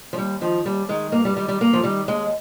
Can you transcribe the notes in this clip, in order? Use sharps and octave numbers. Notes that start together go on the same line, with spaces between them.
F3
D#2 G3
D#3 F3
D#2 G3
D#3 G#3
G2 A#3
G3
D#3 G3
G3
G2 A#3
F3
D#3 G3
D#2 G#3